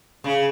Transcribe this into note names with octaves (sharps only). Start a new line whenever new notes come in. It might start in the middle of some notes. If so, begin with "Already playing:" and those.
C#3